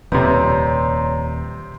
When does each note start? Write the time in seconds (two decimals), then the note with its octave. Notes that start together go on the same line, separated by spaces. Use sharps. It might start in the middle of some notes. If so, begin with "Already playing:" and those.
0.12 D#1 F2 C3 B4 C#5 D5 A#5